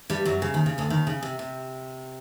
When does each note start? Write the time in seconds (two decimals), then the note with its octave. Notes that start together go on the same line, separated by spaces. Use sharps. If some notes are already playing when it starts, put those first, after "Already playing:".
0.10 G2 G3
0.25 F#2 F#3
0.42 C#3
0.54 D#2 D#3
0.66 C#3
0.78 D2 D3
0.90 D#2 D#3
1.07 C#3
1.23 C3
1.39 C3